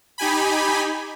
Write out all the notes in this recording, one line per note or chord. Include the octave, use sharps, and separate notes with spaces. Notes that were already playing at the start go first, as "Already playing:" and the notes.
D#4 G4 G#5 B5